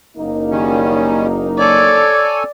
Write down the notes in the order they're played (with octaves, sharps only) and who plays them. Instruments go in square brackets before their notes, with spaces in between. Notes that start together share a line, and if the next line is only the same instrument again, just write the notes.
[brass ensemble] F#1 A#3 D#4
[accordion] D#3 G3 C#4
[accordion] A4 C#5 G#5 [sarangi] D5